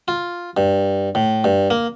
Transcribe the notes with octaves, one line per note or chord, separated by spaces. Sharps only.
F4
G2
A2
G2
A#3